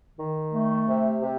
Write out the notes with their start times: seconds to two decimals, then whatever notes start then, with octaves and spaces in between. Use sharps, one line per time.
0.17 D#3
0.52 A3
0.88 C3
1.22 C3